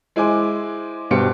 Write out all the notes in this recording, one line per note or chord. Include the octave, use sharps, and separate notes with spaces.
G#3 E4 C5 G#5 D6
G2 B2 G4 C5 C#7